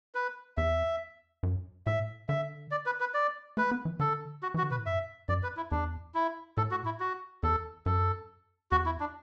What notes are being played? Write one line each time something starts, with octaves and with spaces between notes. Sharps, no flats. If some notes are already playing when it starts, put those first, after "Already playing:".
B4
E2 E5
F#2
A2 E5
D3 E5
D5
B4
B4
D5
A3 B4
B3
E3
D3 A4
F#4
E3
F#4
D3
B2 B4
A2
F#2 E5
F#2 D5
B4
E4
E2 D4
E4
A2 A4
F#4
E4
F#4
E2 A4
F#2 A4
E2 F#4
E4
D4